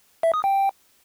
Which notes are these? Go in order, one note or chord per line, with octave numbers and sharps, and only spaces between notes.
E5
D#6
G5